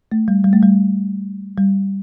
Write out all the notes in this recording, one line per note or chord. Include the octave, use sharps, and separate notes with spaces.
A3
G3
G3
A3
G3
G3